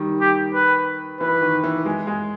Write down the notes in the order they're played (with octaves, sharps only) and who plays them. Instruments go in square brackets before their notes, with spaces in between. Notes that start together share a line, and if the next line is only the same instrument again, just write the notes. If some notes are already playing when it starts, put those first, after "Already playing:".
Already playing: [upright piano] D#3 G3
[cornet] G4
B4
[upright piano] E3 [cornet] B4
[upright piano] D#3
E3
G#3
G#3